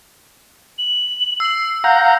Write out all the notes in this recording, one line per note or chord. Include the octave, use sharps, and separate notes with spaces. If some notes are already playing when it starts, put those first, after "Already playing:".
F#7
E6 C7
F5 F#5 A#5 G6